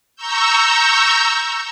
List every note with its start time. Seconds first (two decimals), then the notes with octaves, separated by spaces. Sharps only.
0.16 A#5 C#6 E6 G6